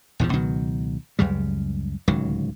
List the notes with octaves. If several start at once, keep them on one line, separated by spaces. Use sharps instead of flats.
A#1 E2 G#2 F3
C#2 B2 D#3 F#3
C#2 F#2 C#3 G3
D1 C#2 D#3 F#3